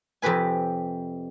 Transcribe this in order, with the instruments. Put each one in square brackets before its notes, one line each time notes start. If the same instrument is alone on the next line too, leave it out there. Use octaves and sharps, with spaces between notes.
[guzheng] F2 C3 G4 B4 G#5